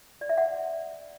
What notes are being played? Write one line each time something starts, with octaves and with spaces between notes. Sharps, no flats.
D5
E5
F#5